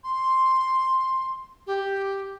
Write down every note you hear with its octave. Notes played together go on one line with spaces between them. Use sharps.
C6
G4